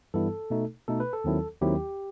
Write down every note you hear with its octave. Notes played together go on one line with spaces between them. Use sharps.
G2 E3 G3 B3 E4 A4
B2 A3 D#4
B2 A3 D#4 A4
B4
A4
D#2 D#3 F#3 C4 E4
D#2 D#3 F#3 C4 E4 G4